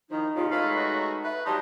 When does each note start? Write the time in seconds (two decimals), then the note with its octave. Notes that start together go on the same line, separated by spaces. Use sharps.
0.10 D#3 F3 D#4 E4
0.35 D#2 A#2 C#3 F4
0.51 G#3 A3 B4 C#5 F5
0.76 F#4
1.24 B4 E5
1.45 E3 F#3 G3 D#4 A5 C6